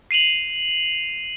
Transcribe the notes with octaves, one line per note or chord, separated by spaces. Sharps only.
C7 D#7 F7 F#7